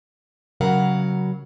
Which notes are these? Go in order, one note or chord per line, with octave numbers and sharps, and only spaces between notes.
C#3 F#3 A#4 F5 F#5 A#5